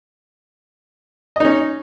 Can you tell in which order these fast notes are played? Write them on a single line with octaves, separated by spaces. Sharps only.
D#5 D#4 C#4